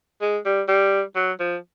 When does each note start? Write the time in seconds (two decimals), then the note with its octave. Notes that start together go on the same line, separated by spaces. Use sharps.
0.21 G#3
0.45 G3
0.68 G3
1.15 F#3
1.40 F3